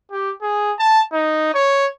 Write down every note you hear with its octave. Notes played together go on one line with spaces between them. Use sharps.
G4
G#4
A5
D#4
C#5